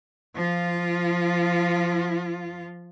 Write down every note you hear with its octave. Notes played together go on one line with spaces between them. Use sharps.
F3 F4